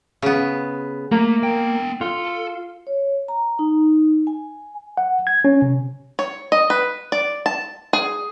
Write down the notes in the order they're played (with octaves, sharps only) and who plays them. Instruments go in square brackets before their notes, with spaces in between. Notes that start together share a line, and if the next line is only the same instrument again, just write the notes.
[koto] C#3 B3
[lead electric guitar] A3 [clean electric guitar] A#3 A#4
[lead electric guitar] B3 G5
[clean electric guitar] F4 [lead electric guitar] A4
[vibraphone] C#5
A#5
D#4
G#5
[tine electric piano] F#5
G#6
C#4
C3
[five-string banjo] C#5
D#5
B4
D5
A5
G#4